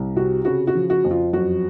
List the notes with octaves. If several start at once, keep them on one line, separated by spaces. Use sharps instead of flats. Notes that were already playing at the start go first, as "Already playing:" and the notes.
Already playing: C2
C3 F#4
C#3 F#4
F#4
F3
F#4
F2
F4
F#2 F#4